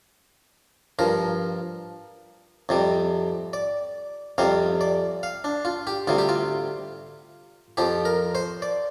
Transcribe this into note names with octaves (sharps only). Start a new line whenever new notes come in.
G2 F3 A#4
F2 C3 G3
D5
F2 C3 G3 F5
D5
F5
D4
F4
G4
D2 C3 G3 F4
G4
F4
F2 F3 G4
A#4
C5
D5